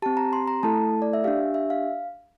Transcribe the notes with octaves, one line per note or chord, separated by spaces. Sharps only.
C4 G4 A5
A#5
C6
A#5
A3 E4 A4 A5
D5
E5
D4 G4 F5
E5
F5